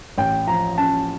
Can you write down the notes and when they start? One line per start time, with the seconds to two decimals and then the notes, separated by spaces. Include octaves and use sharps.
0.18 A1 G5
0.47 F3 A#5
0.78 C#4 A5